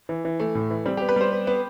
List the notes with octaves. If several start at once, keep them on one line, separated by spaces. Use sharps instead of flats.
E3
E3
E3 A3
A2
E3
G3 C4
G4
B3
B4
G3 C5
B3
B3